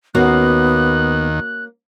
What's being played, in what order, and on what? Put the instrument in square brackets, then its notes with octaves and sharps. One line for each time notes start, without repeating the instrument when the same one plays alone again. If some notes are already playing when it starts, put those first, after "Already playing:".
[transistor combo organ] D#2 D#3 [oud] A#3 C#4 F#4 [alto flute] B3 [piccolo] F#6